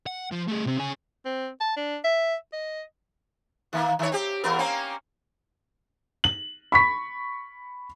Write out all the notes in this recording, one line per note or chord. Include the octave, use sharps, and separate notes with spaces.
F#5
F3
A3 G#4
C3 C4
C#3 G#5
C4
A5
D4
E5
D#5
D#3 A#3
D#3 C#5
C4 G4
E2 B3 A#4
A#3 C4 C#4
F#7
B5 C#6 B6